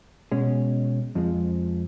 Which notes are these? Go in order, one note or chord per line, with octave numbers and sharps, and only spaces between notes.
B2 G#3 C#4
F2 F3 G#3